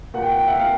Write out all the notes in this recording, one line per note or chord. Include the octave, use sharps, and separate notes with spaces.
A#2 F#5
G5
F#5
G5
E5 F#5
A#2 F5 G5